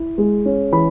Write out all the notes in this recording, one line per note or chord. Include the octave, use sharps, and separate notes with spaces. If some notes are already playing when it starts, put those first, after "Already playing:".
Already playing: E4
G#3
C#4
E3 B5